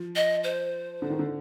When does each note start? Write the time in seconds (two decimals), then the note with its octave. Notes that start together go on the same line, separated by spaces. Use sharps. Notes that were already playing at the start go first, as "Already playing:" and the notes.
Already playing: F3
0.16 D#5
0.44 C5
1.02 D3
1.10 D#3
1.19 D3